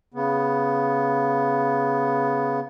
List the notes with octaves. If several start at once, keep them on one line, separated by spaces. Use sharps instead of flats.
C#3 B3